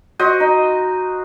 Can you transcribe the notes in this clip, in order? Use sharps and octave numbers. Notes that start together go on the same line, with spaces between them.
F#4 C5 D#5
D#4